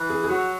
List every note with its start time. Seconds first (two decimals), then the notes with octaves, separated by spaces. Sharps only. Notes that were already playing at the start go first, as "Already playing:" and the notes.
Already playing: E3
0.10 G#4
0.23 G#4
0.29 F#3 F#4